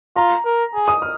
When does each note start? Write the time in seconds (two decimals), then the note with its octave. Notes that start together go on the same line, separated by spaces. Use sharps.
0.16 F4 A#5
0.45 A#4
0.74 G#4
0.88 D#6
1.02 F6